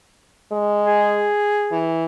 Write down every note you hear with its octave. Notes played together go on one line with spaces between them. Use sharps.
G#3
G#4
E3